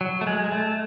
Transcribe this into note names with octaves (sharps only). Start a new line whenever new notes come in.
F#3
A3
G#3
G#3
A3